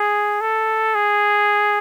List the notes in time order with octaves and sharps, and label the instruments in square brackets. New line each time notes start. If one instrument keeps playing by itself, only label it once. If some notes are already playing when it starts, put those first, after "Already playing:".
Already playing: [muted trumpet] G#4
A4
G#4